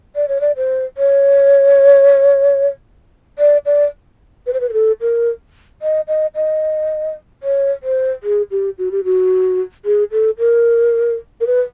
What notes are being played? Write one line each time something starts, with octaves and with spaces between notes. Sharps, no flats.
D5
C#5
D5
C5
C#5
D5
D5
B4
C5
B4
A#4
A4
A#4
D#5
D#5
D#5
C#5
C5
G#4
G4
F#4
G4
F#4
G#4
A4
A#4
A#4
B4